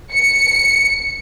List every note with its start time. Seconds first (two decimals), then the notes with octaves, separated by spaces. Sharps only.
0.13 C#7